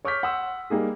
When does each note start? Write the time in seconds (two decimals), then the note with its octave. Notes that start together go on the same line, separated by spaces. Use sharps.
0.05 C#5 C#6 D6 F6 G6 B6
0.23 F#5 C6 D#6 E6
0.70 G3 G#3 A#3 D#4 G#4